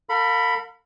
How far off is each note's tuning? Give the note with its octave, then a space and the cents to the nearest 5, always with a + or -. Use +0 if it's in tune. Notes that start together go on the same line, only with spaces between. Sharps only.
A#4 -45 F5 +30 B5 +0